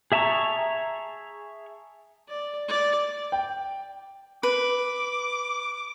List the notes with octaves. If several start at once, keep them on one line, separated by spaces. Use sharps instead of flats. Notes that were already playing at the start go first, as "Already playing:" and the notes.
G#4 E5 A5 A#5 C#6
D5
D5
G5
B4 D6